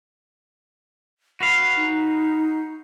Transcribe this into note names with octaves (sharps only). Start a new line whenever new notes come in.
F#4 B4 F5 B5
D#4